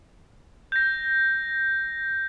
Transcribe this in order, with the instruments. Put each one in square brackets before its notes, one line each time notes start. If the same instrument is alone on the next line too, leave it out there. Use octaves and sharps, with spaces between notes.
[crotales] G6 A#6